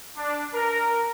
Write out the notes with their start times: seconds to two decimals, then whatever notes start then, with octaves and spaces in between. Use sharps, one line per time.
0.17 D4
0.55 A#4